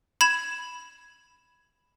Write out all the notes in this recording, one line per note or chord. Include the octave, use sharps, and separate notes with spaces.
B5 G#6 E7